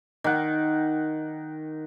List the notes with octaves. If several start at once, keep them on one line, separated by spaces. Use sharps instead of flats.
D#3 F#5